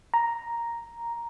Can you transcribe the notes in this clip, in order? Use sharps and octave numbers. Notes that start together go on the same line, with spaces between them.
A#5